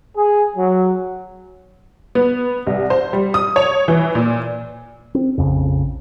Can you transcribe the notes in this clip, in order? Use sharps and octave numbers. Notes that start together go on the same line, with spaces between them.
G#4
F#3
B3
C2
C5
G3
D#6
C#5
E3
A#2
C4
A#1 F2 C#3